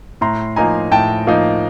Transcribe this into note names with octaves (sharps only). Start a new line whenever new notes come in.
A2 A#5 C6
F3 A#3 D#4 G#5 A#5
A2 G5 A5
F3 A#3 D#4